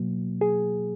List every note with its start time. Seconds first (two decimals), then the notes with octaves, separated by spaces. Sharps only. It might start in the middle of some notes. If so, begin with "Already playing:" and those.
Already playing: B2 F#3 A#3
0.41 G#4